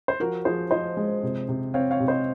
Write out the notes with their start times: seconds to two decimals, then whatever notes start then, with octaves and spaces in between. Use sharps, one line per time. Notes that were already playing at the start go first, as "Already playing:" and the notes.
0.08 C5
0.20 F3 F#4 A#4
0.45 F3 G#4 C5
0.71 F3 C5 D#5
0.97 G#3
1.23 C3
1.49 C3
1.74 C4 C#5 F5
1.91 C#5 F5
2.00 C3
2.08 C5 D#5